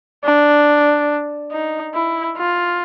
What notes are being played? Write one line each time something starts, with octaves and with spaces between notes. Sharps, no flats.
D4
D#4
E4
F4